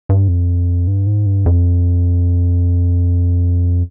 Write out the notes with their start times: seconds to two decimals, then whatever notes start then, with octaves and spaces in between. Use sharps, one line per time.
0.09 G2
0.28 F2
0.87 G2
1.06 G#2
1.26 G2
1.46 F2